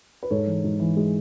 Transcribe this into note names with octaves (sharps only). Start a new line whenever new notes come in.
B4
G#2 A4 C#5
E3
G#2
E3
G#3